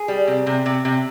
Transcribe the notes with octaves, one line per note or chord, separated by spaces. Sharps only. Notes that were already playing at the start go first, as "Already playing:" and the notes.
Already playing: G#4
G3
C3
C3
C3
C3